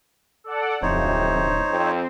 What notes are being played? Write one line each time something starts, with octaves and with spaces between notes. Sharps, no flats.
A4 D5 F#5
D1 F2 C3 D#4 C5 C#5
F2 C4